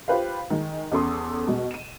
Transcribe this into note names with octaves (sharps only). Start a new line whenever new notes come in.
F4 G4 B4 C5 F5
D#3 G#3
E2 C#4 A4 C6 D#6
B2 G#3
D#7 E7